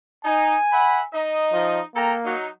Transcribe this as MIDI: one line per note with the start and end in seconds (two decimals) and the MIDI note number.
0.24 0.55 63
0.24 1.08 80
0.72 1.00 76
0.72 1.00 78
0.72 1.00 83
1.12 1.81 63
1.12 1.81 75
1.52 1.80 53
1.96 2.34 58
1.96 2.13 69
1.96 2.13 79
1.96 2.13 82
2.24 2.47 54
2.24 2.47 63